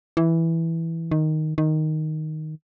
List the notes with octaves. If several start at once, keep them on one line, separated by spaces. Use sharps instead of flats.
E3
D#3
D#3